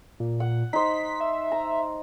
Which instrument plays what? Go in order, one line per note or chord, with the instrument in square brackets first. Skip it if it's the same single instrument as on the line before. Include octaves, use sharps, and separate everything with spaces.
[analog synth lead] A#2
[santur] F#5
[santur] D#4 C5 [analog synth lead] B6
[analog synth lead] E5
[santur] A#5